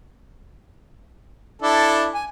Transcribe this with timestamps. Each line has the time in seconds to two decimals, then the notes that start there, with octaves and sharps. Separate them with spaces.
1.62 D4 E4 A4
2.14 G#5